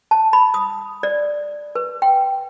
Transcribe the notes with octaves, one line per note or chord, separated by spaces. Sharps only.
A5
B5
D#6
D5
B4
G5